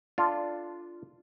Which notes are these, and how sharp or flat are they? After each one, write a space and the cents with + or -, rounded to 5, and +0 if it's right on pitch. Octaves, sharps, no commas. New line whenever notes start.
D4 +0 F4 -10 A4 +0